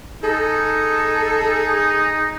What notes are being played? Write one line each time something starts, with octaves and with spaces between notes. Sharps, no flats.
D#4 G#4 A4